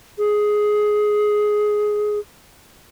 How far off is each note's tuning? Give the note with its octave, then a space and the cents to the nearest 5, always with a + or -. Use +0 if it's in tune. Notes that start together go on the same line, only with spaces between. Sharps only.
G#4 +10